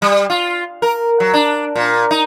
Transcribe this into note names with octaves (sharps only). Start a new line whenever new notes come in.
G3
F4
A#4
F#3
D4
A#2
D#4